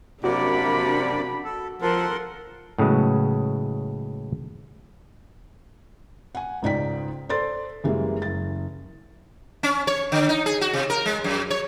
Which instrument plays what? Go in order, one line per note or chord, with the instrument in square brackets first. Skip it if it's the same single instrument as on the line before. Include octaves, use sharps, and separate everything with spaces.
[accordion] F#2 A#3 D5 [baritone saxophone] C3 [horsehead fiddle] D4 B5 [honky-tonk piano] F#4
[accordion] A4
[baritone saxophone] F3 [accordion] A4 F#5 C6 [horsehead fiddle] A#4
[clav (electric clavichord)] A2 C#3 F#3 G#3 B3
[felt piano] F#5 G#5
C#2 G#2 D#4 D5 G5 B6
A4 C5 D5 C6 A6
F#2 E3 G3 G#3 A#3
F#1 A6
[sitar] C#4
C#5
D3
D#4
G#4
F#4
C3
A#4
G#3
F#2
C#5